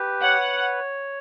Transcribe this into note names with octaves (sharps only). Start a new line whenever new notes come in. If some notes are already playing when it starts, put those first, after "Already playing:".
Already playing: G4 B4
C#5 F#5